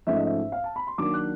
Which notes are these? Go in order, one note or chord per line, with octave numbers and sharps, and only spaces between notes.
G#2 F3 A3 C#4 E5
D#5
E5
F5
A5
B5
C6
D#3 F#3 A#3 D4 D6
F#6